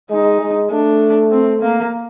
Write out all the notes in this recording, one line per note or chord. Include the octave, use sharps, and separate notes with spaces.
G#3 D#4
G#3
A3 D4
C4
A#3